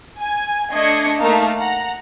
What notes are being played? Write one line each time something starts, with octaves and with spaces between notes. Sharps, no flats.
G#5
A3 D4 D#5 G#6 C7 C#7
A3 A#3 D#4 A#4 F5 A5
F#5 A#5